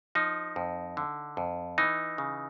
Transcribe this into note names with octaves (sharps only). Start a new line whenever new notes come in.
F3 D#4
F2
D3
F2
E3 D#4
C#3